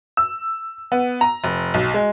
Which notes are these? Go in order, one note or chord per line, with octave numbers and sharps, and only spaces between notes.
E6
B3
A#5
F1
B1
G#3